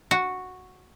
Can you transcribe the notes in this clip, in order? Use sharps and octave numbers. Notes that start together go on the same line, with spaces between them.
F#4